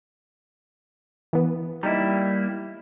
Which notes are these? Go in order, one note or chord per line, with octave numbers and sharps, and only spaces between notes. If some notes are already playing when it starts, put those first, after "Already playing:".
E3 B3
G3 A#3 D#4 E4